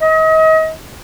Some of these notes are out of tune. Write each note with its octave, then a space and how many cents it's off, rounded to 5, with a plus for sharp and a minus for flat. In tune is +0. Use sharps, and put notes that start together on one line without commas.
D#5 +35